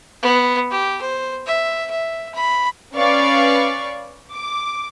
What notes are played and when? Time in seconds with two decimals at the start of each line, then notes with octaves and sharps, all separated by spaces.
0.22 B3
0.71 G4
1.01 C5
1.46 E5
1.90 E5
2.35 B5
2.95 C#4 B4 D5 F5 C#6
4.32 D6